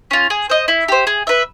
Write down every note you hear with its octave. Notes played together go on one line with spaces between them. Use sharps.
C#4 F4
G#4
C5 D#5
E4
G4 C5
G#4
B4 E5